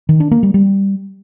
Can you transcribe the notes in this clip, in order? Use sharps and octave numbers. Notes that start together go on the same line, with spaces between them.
D#3
D4
A#3
G3
G3